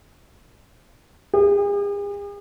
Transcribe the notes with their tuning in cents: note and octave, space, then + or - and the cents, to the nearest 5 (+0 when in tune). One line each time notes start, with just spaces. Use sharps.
G#4 -45